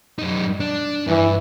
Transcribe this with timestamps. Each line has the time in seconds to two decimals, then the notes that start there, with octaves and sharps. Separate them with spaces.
0.19 F#2 D#4
0.60 D4
1.07 G2 E3